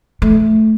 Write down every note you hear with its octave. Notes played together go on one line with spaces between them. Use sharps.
A3